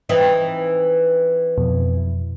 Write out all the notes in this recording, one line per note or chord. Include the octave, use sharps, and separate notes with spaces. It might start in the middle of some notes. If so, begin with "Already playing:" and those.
E3 C4 D#4
F2 B2